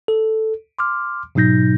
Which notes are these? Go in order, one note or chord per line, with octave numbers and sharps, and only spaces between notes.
A4
C6 D6 F6
G#2 B2 F#3 D#4 G6 A#6